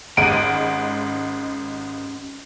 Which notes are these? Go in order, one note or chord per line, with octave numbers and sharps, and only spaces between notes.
G#1 G#3 C#4 G4 F#5 D7 D#7